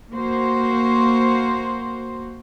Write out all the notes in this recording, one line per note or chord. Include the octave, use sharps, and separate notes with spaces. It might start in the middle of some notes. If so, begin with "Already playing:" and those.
A#3 F#4 C5